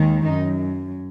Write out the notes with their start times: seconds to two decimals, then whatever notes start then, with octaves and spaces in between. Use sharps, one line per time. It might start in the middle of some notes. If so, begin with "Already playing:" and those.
Already playing: D#2 D#3 G#3
0.25 F#2 D#4